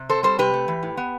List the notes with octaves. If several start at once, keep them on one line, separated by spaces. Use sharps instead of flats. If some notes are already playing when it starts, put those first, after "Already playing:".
Already playing: C3
C4 A4 C5
G3 A4 C5
C3 G4 B4
A3
E3
A2
B3